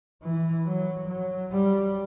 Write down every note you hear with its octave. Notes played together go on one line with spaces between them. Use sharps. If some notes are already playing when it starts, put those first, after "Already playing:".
E3
F#3
F#3
G3